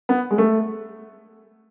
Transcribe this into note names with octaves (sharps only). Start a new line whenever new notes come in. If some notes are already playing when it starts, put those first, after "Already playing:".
B3
G#3
A3